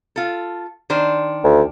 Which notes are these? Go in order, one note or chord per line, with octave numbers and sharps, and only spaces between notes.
F4 A4
D#3 D4 C5
D2